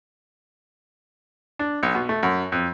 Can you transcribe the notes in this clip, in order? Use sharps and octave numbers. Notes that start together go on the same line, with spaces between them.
D4
B1
B2
A3
F#2
F2